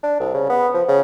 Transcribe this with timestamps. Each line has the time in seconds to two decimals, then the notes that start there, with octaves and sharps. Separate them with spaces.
0.03 D4
0.20 C2
0.34 C#3
0.49 B3
0.74 F3
0.88 C#3